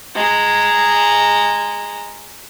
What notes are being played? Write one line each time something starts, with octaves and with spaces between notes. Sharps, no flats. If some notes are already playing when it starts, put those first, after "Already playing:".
G#3 A#5